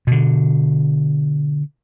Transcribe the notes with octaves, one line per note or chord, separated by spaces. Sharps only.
B2 D3